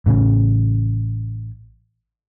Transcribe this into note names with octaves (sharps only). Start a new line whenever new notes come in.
A1 A2 C#3